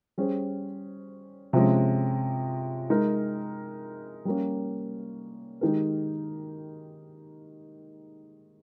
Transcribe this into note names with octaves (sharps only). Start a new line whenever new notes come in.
G3 C#4 G#4 C5
C3 F3 G#3 C#4
G#3 D#4 A#4
G3 A#3 C#4
D#3 G#3 D#4 G4 A#4